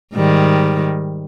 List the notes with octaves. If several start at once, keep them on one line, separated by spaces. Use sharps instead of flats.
G#2 D#3 G3